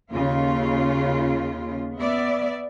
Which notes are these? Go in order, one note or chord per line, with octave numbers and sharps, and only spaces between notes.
D#2 C#3 F4
B3 D5 E5